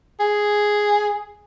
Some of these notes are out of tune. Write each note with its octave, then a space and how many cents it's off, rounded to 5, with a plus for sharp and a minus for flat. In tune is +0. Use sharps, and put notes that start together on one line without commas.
G#4 +0